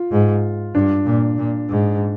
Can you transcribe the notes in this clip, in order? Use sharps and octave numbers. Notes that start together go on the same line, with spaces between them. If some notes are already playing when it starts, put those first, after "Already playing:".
Already playing: F4
G#2
G2 D4
A#2
A#2
G#2